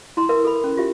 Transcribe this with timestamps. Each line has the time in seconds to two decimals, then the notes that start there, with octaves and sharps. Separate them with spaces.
0.17 E4 A#5 C6
0.29 A#4 B4 E5
0.45 A4 B5
0.64 C#4
0.77 F4 G4 E5